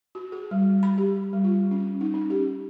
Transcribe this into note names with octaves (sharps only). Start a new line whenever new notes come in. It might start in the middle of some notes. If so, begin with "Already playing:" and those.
F#4
G#4
G3
B5
G4
G3
F4
C#4
D#4
C#4
G4